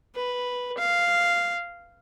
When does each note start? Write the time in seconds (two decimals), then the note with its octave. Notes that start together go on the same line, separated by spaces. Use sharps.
0.16 B4
0.78 F5